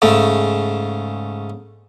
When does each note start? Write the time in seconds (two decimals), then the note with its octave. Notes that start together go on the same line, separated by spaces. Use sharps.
0.02 G#2 C#3 A3